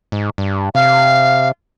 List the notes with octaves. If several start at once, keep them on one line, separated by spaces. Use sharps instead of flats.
G#2
G2
C3 F5